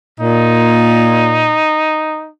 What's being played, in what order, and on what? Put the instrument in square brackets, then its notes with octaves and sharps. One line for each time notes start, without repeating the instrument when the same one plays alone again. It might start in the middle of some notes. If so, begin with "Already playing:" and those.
[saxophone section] A#2 [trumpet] D#4